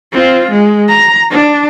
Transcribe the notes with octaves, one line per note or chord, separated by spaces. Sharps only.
C4 F4
G#3
A#5
D4